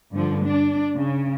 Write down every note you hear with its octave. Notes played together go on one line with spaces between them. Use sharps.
G2 D3 F3
D4
C#3